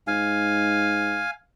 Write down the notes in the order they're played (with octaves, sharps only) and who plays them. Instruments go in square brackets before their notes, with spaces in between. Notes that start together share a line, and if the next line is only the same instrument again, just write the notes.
[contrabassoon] G#2 [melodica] F5 G#5